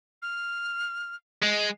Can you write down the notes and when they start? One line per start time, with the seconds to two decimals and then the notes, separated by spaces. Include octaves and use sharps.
0.22 F6
1.43 G#3 D#5